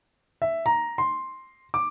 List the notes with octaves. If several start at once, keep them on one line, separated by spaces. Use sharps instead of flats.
E5
A#5
C6
D6